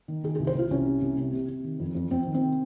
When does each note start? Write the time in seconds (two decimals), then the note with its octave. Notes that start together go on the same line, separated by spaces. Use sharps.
0.08 D#3
0.24 D#3 G#4
0.36 G#4
0.40 C2
0.47 C5
0.55 C2 F4
0.70 C2 C#4
0.86 C3
1.02 C2
1.18 C3
1.33 C3
1.49 C3
1.64 D#3
1.80 F2
1.95 F2
2.10 F2 C4
2.27 D#3
2.34 C4
2.41 C3